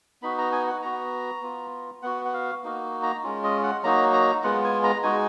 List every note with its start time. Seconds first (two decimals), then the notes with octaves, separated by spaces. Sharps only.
0.22 B3 D#4 F#4 B5
0.38 A#5
0.52 G#5
0.67 F#5
0.82 B3 F#4 A#5
1.42 B3 F4
2.02 B3 F#4 F#5
2.25 F#5
2.33 F5
2.64 A#3 D#4 F#4
3.03 A#5
3.23 G#3 C#4 F4
3.44 D#5
3.63 F#5
3.83 F#3 A#3 D#4 F#4 A#5
4.13 A#5
4.44 G#3 B3 F4 F#5
4.64 G#5
4.84 A#5
5.03 G#3 D#4 F#4 G#5